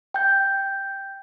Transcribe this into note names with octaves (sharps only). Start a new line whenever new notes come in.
G5 G6